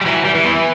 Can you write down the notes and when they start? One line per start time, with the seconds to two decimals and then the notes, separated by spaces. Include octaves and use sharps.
0.01 G3
0.06 E3 F#3
0.25 G3
0.35 E3
0.45 B3